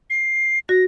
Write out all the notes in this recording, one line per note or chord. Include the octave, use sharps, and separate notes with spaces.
C7
F#4 A#6